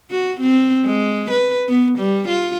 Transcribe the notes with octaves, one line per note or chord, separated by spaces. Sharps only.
F#4
C4
G#3
B4
B3
G3
F4